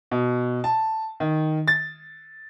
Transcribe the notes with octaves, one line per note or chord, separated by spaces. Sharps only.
B2
A5
D#3
A6